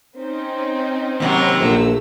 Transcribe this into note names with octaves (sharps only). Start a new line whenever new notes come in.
C4 C#4 D#4
D#2 C3 F#3
A#1 A3 E6